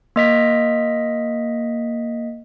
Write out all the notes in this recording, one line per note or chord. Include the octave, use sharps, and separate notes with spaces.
A#3 D#5 B6